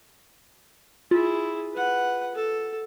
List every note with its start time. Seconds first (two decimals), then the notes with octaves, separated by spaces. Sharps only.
1.11 E4 F4 G#4
1.73 B4 F#5
2.35 A4